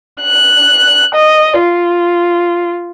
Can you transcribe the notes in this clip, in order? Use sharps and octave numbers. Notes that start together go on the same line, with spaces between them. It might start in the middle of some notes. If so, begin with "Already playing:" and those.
F#6
D#5
F4